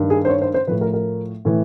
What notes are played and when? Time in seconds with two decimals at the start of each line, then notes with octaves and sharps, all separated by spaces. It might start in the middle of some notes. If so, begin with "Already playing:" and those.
Already playing: G2 D#3
0.10 G#4
0.25 C5
0.29 C#5
0.41 C5
0.54 C5
0.67 A2 F3 B4
0.81 A#4
0.93 A#4
1.45 A2 E3